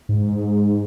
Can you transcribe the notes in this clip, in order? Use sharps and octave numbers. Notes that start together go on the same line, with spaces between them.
G#2